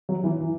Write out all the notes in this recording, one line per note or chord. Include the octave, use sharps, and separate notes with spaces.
F#3
E3
E3